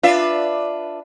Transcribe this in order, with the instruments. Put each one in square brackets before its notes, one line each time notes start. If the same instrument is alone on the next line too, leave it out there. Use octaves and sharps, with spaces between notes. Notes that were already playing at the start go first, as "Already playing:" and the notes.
[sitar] D4 B4 E5 [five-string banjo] F4